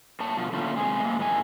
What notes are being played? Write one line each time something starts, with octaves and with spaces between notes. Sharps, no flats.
A#2 C#5 A5
B2 F3
A2 D3 A3 A#3 C#4 F4
C3 G#3 G#4
G#3 A#3
E2 A2 G#3 G#5